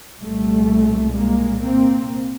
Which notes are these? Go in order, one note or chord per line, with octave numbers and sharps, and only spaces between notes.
C2 A#2 G3 A3
G#3 A#3
A#3 C4